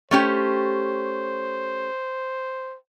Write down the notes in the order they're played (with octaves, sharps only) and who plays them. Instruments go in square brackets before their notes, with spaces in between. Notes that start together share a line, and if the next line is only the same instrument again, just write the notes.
[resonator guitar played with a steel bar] A3 C#4 G4 [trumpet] C5